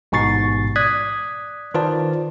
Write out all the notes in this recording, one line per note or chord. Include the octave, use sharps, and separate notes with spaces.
A1 G#2 B2 C#6 A6 C7
D5 D#6 F#6 G#6 B6
D#3 F4 B4 C5 D5 A5